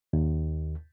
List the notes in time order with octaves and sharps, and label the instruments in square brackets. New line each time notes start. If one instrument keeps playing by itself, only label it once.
[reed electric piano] D#2